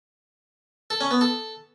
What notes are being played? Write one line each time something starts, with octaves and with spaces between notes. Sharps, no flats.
A4
C#4
B3
A4